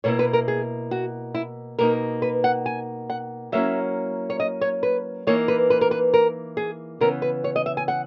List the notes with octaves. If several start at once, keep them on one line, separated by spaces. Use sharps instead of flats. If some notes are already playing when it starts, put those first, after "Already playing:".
B2 A#3 E4 C#5
B4
A#4
G#4
F#4
E4
B2 A#3 D#4 A#4
B4
F#5
G#5
F#5
F#3 A#3 C#4 E4 E5
C#5
D#5
C#5
B4
E3 A#3 D#4 C#5
B4
B4
A#4
B4
A#4
G#4
C#3 E3 B3 A#4
B4
C#5
D#5
E5
G#5
F#5